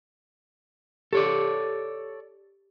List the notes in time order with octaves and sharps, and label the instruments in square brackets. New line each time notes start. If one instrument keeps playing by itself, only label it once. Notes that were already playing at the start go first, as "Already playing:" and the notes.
[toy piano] G4 [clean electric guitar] A4 C#5 D5